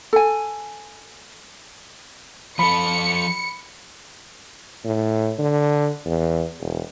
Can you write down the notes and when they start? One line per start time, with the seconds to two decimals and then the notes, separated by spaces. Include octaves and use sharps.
0.13 A4 G#5
2.59 F3 A4 B5 C#7
4.85 A2
5.39 D3
6.06 E2
6.60 E1